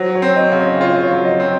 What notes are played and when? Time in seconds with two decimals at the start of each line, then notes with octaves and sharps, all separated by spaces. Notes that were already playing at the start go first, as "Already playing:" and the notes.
Already playing: F#3 C5
0.15 C#5
0.22 C4
0.36 D#5
0.52 C#3
0.60 C#5
0.81 F4 C#5
1.03 C#5
1.11 F#3
1.25 D#5
1.40 C4